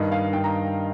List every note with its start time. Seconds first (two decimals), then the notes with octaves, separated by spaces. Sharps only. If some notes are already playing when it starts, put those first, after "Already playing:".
Already playing: G2 D#3 D#5
0.12 F5
0.33 G2 D#3 G5
0.44 A#5